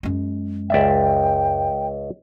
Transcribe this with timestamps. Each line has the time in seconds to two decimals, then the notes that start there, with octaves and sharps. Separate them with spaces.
0.03 F#2 G#3
0.70 C#2 D5 E5 G5